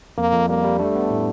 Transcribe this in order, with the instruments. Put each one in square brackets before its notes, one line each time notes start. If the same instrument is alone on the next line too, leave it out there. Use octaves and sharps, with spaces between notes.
[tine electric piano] F2 [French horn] A#3
[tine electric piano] F2
[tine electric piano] G3 [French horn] A#3
[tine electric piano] G3
[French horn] A3 [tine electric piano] D4
[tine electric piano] B3
A2